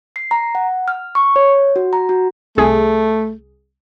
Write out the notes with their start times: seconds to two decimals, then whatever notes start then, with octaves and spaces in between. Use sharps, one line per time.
0.16 C7
0.31 A#5
0.55 F#5
0.88 F6
1.15 C#6
1.36 C#5
1.76 F#4
1.93 A#5
2.09 F#4
2.57 C2 A3 G#4